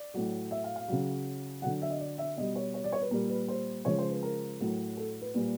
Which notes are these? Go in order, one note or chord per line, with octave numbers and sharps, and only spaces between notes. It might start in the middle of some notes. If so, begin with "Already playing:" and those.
Already playing: D5
A2 F#3
E5
F5
F5
C#3 F#3
D3 F#3 F#5
E5
D#5
D5
E5
B2 G3 D#5
C#5
C#5
D5
C#5
B4
A#2 G3 A#4
B4
C5
C#3 F3 G#3 C#5
C5
B4
A#4
A2 F#3
A4
B4
A#2 G3